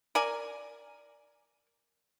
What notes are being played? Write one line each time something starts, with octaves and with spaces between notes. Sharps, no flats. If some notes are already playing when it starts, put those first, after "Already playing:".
A#4 D5 G#5